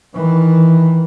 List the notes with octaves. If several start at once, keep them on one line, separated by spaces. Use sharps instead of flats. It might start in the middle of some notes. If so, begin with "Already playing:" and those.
D#3 E3